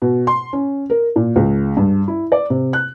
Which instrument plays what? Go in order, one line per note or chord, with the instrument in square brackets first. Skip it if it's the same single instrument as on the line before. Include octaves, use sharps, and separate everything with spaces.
[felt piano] B2
C6
C#4
A#4
A#2
C#2
G2
E4
D5
C3
F#6